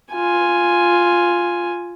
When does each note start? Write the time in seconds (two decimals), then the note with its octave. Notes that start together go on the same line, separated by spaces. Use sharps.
0.14 F4 G#5